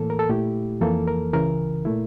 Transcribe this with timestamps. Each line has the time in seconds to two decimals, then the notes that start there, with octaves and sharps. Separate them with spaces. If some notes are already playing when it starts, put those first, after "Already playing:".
Already playing: A2 E3 A#3 A4
0.10 A#4
0.19 A4
0.29 A#2 A3 E4 G4
0.81 F2 E3 A#3 A4
1.07 A#4
1.33 C#2 C#3 E3 A#4
1.85 A#2 A3 E4